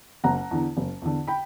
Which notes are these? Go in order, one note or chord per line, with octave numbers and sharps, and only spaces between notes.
F#1 F#5 A#5
E2 D3
F#1
E2 D3
G5 B5